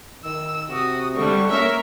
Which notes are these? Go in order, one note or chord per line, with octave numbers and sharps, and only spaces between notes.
D#3 E6
C3 F#4 D#6
D3 G3 D4 C#6
A#3 C#4 A#4 E5